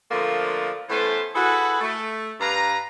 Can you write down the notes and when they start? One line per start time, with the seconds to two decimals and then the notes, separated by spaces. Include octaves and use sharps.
0.11 D3 F3 A3 A#3 C4 F4
0.89 E3 A3 B3 C#4 C5 A5
1.34 E4 F#4 G#4 A4 B4 F#5
1.81 A3
2.40 G2 B4 F5 A#5